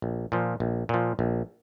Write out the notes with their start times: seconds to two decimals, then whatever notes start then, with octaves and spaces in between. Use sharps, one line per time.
0.02 A#1
0.32 A#2 F3
0.60 A#1
0.89 A#2 F3
1.19 A#1